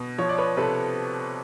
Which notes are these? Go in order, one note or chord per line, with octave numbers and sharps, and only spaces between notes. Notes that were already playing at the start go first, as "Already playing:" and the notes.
Already playing: B2
F3 C#5
D5
B4 C#5
C3 A4 B4